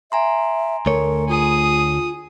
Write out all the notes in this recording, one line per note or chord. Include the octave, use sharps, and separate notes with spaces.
E5 G#5 A#5 C6
D2 A3 A#4 C#5
F4 G#4 D#6